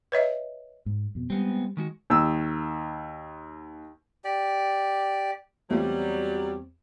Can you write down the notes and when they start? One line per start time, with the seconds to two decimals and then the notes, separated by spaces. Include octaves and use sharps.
0.12 B4 C#5 D#5 E5
0.86 G#2
1.15 F2 B2
1.30 G3 G#3 B3 C4
1.77 D#3 G#3 F#4
2.10 D#2 E6
4.24 G4 D5
5.71 E2 F#3 G3 A3 A#3 C4 F4